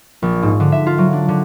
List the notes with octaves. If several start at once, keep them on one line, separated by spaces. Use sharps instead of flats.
A#1
G#2
D3
E5
F4
F#3
D4
D3